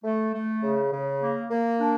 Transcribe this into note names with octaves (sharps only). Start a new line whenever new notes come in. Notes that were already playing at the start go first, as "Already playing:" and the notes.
A3
A3
C#3
C#3
A#3
A#3
D4